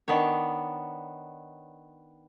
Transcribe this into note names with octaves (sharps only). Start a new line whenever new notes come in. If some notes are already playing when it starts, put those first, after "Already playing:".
D#3 B3 D4 C#5